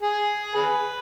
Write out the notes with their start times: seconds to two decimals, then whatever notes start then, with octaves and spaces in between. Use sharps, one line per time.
0.02 G#4
0.55 G#4 B4